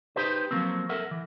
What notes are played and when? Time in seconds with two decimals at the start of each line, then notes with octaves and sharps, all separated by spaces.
0.16 D#4 G4 B4 C5
0.51 F3 F#3 A#3 C4
0.89 A4 A#4 E5 F#5
1.11 E3